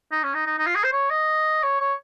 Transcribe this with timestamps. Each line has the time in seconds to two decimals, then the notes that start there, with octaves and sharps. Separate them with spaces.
0.11 D#4
0.23 C#4
0.34 D#4
0.46 D#4
0.58 D#4
0.66 F4
0.75 G#4
0.84 C5
0.92 C#5
1.10 D#5
1.63 C#5
1.80 C#5